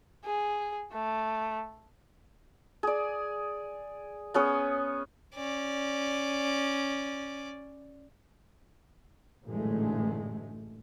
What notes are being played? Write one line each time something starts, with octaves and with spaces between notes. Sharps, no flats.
G#4
A3
G#4 D5
B3 C#4 G#4 C#5
C#4 D5
A1 F#2 A#2 D3 G#3 A3